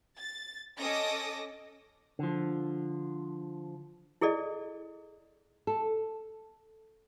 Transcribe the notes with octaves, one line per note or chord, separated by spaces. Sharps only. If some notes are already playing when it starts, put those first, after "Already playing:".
A6
C#4 A4 D#5 D6 D#6 A#6
D3 F3
E4 G#4 A4 D5 D#5
A4